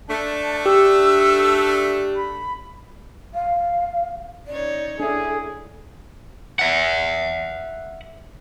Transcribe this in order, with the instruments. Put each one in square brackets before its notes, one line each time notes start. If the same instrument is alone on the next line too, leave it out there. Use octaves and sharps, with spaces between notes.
[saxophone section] A3 D4 [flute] A5
[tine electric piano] G4 [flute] E6
[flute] B5
[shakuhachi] F5
[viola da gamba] C#4 D#4 C#5 [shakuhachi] D5
[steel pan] D4 E5 [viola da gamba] E4 [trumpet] G#4 [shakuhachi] A4
[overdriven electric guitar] E5 F#5